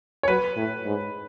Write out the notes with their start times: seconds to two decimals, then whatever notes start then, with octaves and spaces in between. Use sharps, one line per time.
0.23 C#5
0.28 F#3 B4
0.57 A2
0.86 G#2